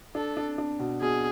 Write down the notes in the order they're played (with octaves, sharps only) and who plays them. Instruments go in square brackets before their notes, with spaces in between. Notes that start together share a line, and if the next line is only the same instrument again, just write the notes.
[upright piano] D4 [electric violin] A4
[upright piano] D4
D4
B2
[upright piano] B2 [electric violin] G#4